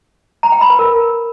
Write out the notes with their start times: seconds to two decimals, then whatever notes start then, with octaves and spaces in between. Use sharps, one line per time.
0.43 A#5
0.52 G5
0.61 B5
0.70 B4
0.79 A#4